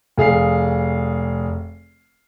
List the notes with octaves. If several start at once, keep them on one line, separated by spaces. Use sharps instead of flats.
F1 G#4 F5 C7